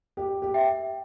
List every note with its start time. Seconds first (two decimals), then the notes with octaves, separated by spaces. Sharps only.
0.17 G4
0.42 G4
0.54 E5 G5